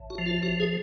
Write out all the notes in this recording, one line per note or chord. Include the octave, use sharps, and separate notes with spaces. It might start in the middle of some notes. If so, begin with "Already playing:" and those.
Already playing: A1
F#4
F3
F4
A1 F#4
G#4